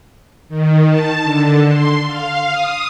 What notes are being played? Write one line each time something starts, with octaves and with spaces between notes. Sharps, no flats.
D#3
A5
D3
C6
F5
D#6